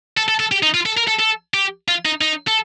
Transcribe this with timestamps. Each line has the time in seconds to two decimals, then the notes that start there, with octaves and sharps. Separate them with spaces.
0.17 A4
0.28 A4
0.40 A4
0.52 G4
0.63 D#4
0.74 F4
0.86 A4
0.97 A#4
1.08 A4
1.19 A4
1.54 G4
1.88 F4
2.05 D#4
2.21 D#4
2.48 A4